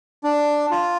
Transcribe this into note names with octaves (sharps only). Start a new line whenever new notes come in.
D4
F4